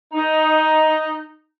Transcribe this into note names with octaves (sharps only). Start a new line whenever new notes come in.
D#4